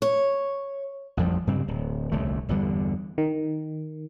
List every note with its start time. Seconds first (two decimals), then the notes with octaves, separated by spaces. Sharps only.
0.02 C#5
1.17 A1 F2 F3 G3
1.47 G2 C#3 G3 C4
1.68 D1
2.12 D#1 C2 D3 A3
2.49 G1 E2 D3 G3
3.18 D#3